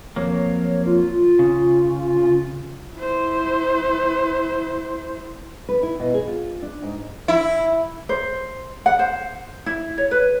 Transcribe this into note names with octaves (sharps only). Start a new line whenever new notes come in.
F2 F#3 A#3 C#5
F4
C#3
E4 C5
B4
E4
B2
G#4
F4
D4
G#2
E4
C5
F#5
C5
E4
C#5
B4